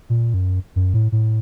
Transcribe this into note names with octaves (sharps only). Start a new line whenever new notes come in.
A#2
F#2
F#2
A2
A2